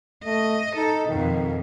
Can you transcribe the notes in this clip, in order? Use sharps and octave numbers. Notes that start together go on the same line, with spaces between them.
A3 D#5
D#4 A4
F2 B2 D#3